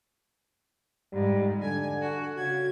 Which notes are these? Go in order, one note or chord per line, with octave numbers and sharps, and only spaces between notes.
F2 G#2 G3
D3 G#5 G#6
F#4
C#3 F#4 G#6